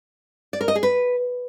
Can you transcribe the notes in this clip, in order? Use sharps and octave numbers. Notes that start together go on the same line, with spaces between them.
D5
A#4
D#5
G#4
B4